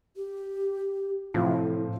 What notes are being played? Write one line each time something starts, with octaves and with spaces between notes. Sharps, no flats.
G4
A2 C3 F3 E4